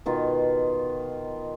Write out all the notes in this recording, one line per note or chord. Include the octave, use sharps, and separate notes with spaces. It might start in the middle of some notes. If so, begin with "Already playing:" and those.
B2 D#3 F4